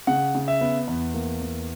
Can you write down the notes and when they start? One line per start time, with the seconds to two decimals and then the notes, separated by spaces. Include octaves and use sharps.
0.07 C#3 F#5
0.35 C#3
0.48 E5
0.61 B3
0.88 E2
1.14 A#3
1.41 E2